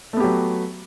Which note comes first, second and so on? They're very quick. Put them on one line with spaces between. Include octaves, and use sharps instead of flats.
A3 B3 G4 F#3